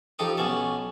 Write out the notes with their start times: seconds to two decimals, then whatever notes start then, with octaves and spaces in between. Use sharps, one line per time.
0.19 F3 D#4 G4 A4 D#6
0.37 B1 B3 C#4 A5